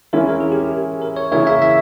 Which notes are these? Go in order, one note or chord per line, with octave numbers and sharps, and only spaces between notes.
E3 G#3 C#4 E4 A#4
A#4
G#4
G4
G#4
A#4
C#5
C#3 E3 A#3 E4 C#5
E5
E5